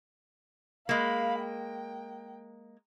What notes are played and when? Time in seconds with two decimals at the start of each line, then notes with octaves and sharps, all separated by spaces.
0.89 G#3 A#3 F5 B5
1.40 G5